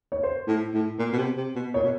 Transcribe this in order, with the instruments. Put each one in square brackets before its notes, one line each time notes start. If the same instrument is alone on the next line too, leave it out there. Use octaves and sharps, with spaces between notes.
[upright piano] C#5
C5
[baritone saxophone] A2
A2
A#2
B2
C3
C3
B2
[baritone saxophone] A#2 [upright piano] C#5
[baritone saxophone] B2